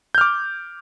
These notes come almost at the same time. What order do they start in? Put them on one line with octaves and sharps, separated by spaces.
G6 F6 D6